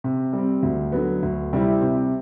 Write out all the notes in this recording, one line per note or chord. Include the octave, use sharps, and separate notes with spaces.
C3
G3
C4
D2
D3 F#3 B3
D2
C3 G3 C4 E4
C3